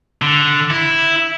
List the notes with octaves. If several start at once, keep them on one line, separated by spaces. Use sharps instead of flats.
D3
E4